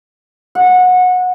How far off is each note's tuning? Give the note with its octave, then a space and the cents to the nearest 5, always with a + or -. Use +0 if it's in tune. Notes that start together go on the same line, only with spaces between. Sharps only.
F#5 -20